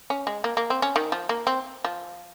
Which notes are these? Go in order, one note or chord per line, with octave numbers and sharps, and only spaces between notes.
C#4
G#3
A#3
A#3
C4
C#4
D#3
F3
A#3
C4
F3